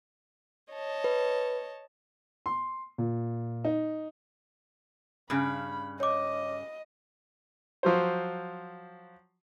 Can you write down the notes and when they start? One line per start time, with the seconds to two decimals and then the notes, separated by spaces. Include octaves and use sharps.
0.71 C#5 D#5 A5
1.04 B4
2.46 C6
2.98 A#2
3.64 D#4
5.30 G2 C#3 B5
6.00 C#5 D#5 D6
7.83 F3 F#3 C5